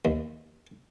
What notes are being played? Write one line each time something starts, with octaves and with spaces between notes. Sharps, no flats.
D#2